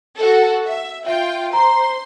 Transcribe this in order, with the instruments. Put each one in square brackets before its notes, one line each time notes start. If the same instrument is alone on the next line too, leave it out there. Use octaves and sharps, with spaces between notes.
[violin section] F#4 A4
E5
[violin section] F4 G5 [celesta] E5
[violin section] C5 C6 [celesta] A#5